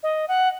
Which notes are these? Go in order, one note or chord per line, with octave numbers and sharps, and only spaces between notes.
D#5
F#5